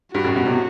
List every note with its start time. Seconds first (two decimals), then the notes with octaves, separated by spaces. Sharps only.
0.14 G2 F#4
0.24 F#2 A2
0.35 G2 B2
0.46 A2 C3